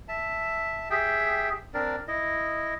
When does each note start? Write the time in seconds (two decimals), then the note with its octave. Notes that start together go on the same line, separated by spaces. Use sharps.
0.08 E5 A5
0.90 G4 G#4 E5 G5
1.74 C4 D4 A#4 D5
2.08 E4 D#5